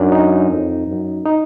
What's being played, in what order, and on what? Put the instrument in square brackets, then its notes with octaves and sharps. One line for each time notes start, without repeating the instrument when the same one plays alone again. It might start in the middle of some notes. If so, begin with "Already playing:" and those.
Already playing: [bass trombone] F#2 [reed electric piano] D4 D#4
[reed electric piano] D#4
[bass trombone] F2
F#2
[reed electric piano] D#4